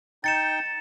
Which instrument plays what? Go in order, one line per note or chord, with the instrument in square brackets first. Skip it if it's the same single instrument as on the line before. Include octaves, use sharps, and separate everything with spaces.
[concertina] D#4 G5 [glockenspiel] A6 C#7 E7